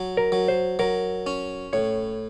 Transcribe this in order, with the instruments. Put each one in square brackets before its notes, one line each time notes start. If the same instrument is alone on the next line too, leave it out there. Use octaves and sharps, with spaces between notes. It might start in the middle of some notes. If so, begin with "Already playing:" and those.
Already playing: [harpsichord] F#3
[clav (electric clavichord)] A#4
[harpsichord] F#3
[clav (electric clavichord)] C5
[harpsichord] F#3 [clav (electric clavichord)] A#4
[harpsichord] C#4
[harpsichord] A2 [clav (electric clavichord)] C#5